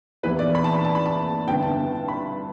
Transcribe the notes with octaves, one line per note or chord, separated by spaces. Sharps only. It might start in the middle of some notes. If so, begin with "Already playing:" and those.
E2 E3 B3 E4 B4
D5
B5
A5
B5
A5
B5
A5
G2 D3 B3 E4 G5
A5
B5